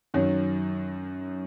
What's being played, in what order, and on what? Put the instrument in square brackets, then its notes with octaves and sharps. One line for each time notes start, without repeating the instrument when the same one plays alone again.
[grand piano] F#2 D#3 F#3